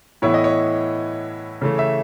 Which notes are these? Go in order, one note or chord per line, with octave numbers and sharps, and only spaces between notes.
A2 E3 B3 E4 C#5
D#5
C#5
C#3 E3 A3
E5